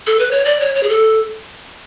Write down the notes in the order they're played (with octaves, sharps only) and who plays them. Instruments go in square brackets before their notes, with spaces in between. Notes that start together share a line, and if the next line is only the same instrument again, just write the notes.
[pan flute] A4
B4
C#5
D5
C#5
C#5
G#4
A4